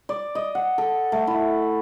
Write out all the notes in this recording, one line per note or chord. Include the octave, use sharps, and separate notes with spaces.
D5
D#5
F#5
A4
A3
E4